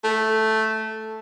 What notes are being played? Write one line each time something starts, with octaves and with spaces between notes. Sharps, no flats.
A3